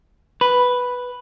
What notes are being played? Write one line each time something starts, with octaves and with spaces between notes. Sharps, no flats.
B4